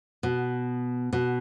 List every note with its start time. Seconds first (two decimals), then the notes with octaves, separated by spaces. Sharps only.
0.23 B2
1.13 B2